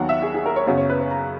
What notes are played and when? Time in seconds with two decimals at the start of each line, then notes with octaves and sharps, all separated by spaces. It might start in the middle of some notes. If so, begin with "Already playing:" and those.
Already playing: D#2 D#3 F#3 B3 F#5
0.09 E5
0.22 G#4
0.34 G#4
0.46 A#4
0.56 C#5
0.66 F#2 C#3 F#3 B3 C#5
0.77 C#5
0.90 B4
1.00 C#5
1.11 A#5